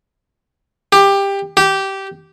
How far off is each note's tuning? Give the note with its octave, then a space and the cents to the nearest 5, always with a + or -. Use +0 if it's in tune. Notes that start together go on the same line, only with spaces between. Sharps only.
G4 +15
G4 -15